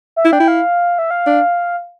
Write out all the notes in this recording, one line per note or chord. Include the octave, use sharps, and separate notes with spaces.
E5
E4
D4 G5
E4
F5
E5
F5
D4